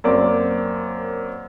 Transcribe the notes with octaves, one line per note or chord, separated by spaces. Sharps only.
F#2 A#3 C4 D5 D6